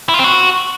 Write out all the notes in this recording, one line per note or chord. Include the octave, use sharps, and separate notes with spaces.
E4
F4
C4
F#4